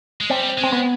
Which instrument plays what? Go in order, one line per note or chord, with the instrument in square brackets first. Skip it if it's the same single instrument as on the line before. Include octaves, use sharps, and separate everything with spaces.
[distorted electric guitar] G#3
[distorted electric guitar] G3 [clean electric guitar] C4
[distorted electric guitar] G#3
[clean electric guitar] C4
B3